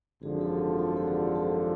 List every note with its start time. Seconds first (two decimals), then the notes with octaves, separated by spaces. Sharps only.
0.22 G#1 F#2 D3 F3 F#4 G#4
0.41 G4 A4
0.79 F4 G4
0.97 A4
1.07 F#4 G#4
1.35 G4 A4